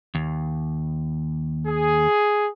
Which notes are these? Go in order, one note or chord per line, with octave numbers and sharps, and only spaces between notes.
D#2
G#4